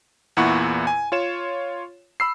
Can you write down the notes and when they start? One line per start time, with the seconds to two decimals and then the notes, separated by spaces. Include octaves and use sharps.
0.37 E2 A#2 E4 F#5 B5 C#6
0.87 G#5
1.12 F4 C#5 E7
2.20 B5 E6 C7